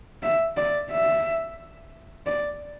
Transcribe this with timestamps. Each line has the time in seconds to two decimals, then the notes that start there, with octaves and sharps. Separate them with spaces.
0.23 E5
0.57 D5
0.91 E5
2.26 D5